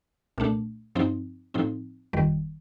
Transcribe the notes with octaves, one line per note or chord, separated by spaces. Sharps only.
C2 A#2 A3 D4
G2 F3 C4 D#4
A2 F3 C4 D#4
G1 F2 D#3 G3